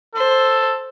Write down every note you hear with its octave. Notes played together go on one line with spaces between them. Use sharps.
A4 C5